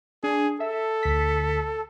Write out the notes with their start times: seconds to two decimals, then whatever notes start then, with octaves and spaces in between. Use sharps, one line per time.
0.24 D4 G#4
0.60 A4 E5
1.03 D2 B6